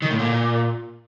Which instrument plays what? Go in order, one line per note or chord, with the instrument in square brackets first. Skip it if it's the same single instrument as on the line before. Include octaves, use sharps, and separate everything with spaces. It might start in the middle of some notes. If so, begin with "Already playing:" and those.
[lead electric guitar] D#3
A2
A#2